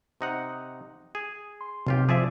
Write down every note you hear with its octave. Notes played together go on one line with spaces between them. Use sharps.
C3 D#4 F#5
G#4
C6
B1 C3 F4 G4
F3 G#4 D5 E5